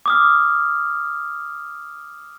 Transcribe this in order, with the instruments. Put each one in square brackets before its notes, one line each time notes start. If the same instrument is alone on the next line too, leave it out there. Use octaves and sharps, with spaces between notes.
[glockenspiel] D6 D#6 F6